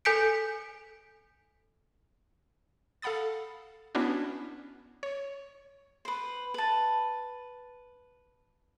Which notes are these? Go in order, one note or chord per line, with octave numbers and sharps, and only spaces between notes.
A4 G#5 G6 B6 C#7 D7
A4 F5 F#5 B5 D#6 A6
B3 C#4 D4 E4 F#4
C#5
B4 C5
B4 A5